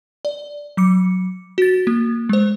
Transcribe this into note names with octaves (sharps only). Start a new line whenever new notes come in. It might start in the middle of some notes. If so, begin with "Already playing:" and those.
D5
F#3 D6 C#7
F#4 A6
A#3
G#3 C5